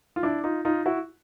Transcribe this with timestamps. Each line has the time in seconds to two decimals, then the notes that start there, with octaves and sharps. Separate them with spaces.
0.16 F4
0.23 D4 E4
0.44 D#4 F4
0.65 D#4 F4
0.86 E4 F#4